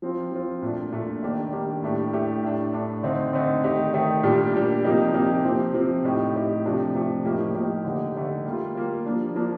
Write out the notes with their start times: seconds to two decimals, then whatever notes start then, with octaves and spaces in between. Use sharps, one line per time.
0.02 F3 C4 F4
0.32 F3 C4 F4
0.62 A#2 A3 D4
0.92 A#2 A3 D4
1.23 D#3 G3 A#3 D4 G4
1.52 D#3 G3 A#3 D4 G4
1.83 A2 A3 D4 G4
2.13 A2 A3 D4 G4
2.43 A2 A3 D4
2.73 A2 A3 D4
3.03 D3 A3 C4 D#4
3.33 D3 A3 C4 D#4
3.64 D#3 A3 D#4 G4
3.93 D#3 A3 D#4 G4
4.23 A#2 G3 D4 G4
4.53 A#2 G3 D4 G4
4.84 C3 F3 A#3 D#4 G4
5.14 C3 F3 A#3 D#4 G4
5.44 C3 F3 C4
5.74 C3 F3 C4
6.04 A2 A3 D#4 G4
6.35 A2 A3 D#4 G4
6.65 C3 F3 A3 D4 G4
6.95 C3 F3 A3 D4 G4
7.25 A2 F3 A#3 D#4 G4
7.55 A2 F3 A#3 D#4 G4
7.85 D3 A3 D#4 G4
8.16 D3 A3 D#4 G4
8.45 G3 A#3 F4
8.75 G3 A#3 F4
9.06 F3 A#3 D4
9.35 F3 A#3 D4